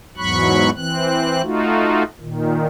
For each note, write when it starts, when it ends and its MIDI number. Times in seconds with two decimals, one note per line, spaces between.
0.17 0.70 40
0.17 0.70 44
0.17 0.70 54
0.17 0.70 83
0.17 0.70 85
0.17 0.70 90
0.76 1.42 52
0.76 1.42 60
0.76 1.42 90
1.43 2.03 57
1.43 2.03 63
1.43 2.03 65
1.43 2.03 66
2.21 2.67 46
2.21 2.67 51